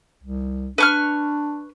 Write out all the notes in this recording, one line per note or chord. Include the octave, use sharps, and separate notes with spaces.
C2
D4 B4 C#6 F6